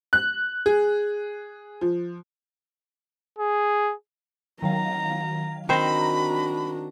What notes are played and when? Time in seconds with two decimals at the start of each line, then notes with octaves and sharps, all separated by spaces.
0.13 F#6
0.66 G#4
1.81 F3
3.38 G#4
4.62 D#3 F#3 F5 A#5
5.69 D#3 C4 D4 F#4 C5 A#5 B5 A#6